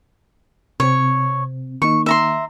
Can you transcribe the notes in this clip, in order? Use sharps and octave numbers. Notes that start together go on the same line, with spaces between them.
C3 C4 C#5
D#3 A#3 D#4 C#6
E5 A#5 C6